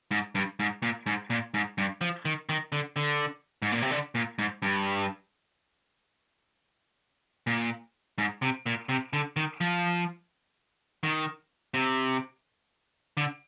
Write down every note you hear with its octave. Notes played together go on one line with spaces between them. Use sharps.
G#2
G2
G#2
A#2
G#2
A#2
G#2
G2
F3
D#3
D#3
D3
D3
G#2
A#2
C3
D3
A#2
G#2
G2
A#2
G#2
C3
A#2
C3
D3
D#3
F3
D#3
C3
D3